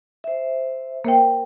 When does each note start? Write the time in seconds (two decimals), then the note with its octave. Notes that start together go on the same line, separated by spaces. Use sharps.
0.24 C5 E5
1.05 A#3 A#4 C5 G5